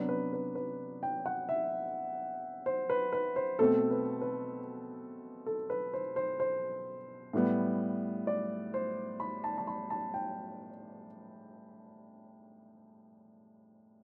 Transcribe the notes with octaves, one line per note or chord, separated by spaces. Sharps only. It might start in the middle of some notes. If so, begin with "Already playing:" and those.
Already playing: C3 F#3 B3 D4
B4
B4
B4
G5
F#5
E5
C5
B4
B4
C5
B2 A3 C4 A4
B4
B4
A4
B4
C5
C5
C5
A2 G3 B3
D5
C5
B5
A5
A5
B5
A5
G5